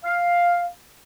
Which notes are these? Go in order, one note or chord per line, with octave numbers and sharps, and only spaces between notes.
F5